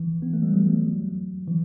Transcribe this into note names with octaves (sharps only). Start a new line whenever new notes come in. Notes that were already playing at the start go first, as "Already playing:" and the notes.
Already playing: E3
B3
A3
G3
F#3
E3